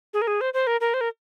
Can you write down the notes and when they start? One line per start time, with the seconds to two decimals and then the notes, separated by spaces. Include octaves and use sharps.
0.14 G#4
0.22 A#4
0.27 G#4
0.41 C5
0.54 C5
0.67 A#4
0.81 A#4
0.94 C5
1.01 A#4